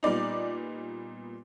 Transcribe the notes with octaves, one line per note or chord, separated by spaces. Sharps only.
A#2 G3 B3 D#4 D5